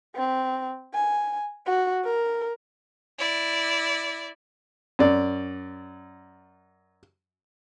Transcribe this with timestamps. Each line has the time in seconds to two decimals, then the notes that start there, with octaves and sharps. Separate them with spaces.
0.16 C4
0.94 G#5
1.66 F#4
2.05 A#4
3.18 E4 D5
4.99 F#2 D5